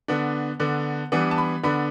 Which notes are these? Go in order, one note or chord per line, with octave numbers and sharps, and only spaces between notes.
D3 B3 D4
D3 B3 D4
E3 G3 B3 D4
A5
B5
D3 B3 D4 B5